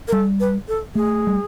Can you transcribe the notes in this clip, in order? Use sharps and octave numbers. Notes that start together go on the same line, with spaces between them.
A#4
G3 A4
B4
A4
A3 G#4
G3